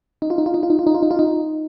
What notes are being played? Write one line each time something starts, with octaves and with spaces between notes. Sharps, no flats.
D#4
F4
D#4
F4
D#4
F4
D#4
F4
D#4
F4
D#4
F4
D#4